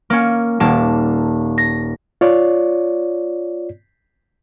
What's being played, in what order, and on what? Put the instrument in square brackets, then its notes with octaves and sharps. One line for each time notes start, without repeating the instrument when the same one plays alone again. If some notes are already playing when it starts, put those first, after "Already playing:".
[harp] A#3 C#4
D#1 A#3 A5
A#6
[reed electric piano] F4 C#5 D5